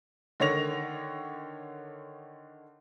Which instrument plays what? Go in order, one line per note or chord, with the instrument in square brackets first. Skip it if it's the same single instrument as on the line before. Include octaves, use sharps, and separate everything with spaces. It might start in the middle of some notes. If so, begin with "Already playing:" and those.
[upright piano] D3 D#3 C#5 A#6 F7